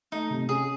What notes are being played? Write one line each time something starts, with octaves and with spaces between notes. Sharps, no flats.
A3 D#4
C3
C#4 G#4